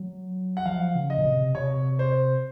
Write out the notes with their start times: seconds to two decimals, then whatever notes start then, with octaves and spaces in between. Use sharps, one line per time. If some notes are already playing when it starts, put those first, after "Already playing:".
Already playing: F#3
0.57 F#5
0.65 F3 F5
0.95 C#3
1.10 D#5
1.18 A#2
1.25 C3
1.55 C3 C#5
1.99 C5